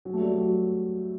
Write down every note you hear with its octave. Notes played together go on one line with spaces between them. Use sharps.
F#3
A3
G3
F#3